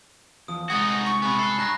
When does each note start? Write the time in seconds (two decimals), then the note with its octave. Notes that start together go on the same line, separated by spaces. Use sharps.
0.48 E2 F3 D#6
0.70 C2 G#3 D#4 F#4 F#5 D#6 G#6 A6
1.06 C#6
1.22 C3 B3 G#5 B5
1.39 A4 F#6 C7
1.58 G2 A#5 F#6 A#6